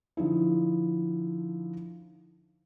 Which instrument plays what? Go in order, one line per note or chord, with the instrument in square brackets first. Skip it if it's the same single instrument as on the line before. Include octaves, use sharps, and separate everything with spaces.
[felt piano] D3 F3 D#4 E4